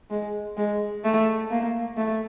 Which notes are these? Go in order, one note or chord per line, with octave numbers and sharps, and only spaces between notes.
G#3
G#3
A3
A#3
A3